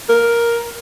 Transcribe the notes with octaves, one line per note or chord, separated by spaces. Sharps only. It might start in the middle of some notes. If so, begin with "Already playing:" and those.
A#4